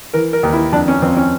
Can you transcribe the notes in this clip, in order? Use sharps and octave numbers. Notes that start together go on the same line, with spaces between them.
E3 A#4
A#4
D#2
E4
F2 D4
C#4
F2 C4
C#4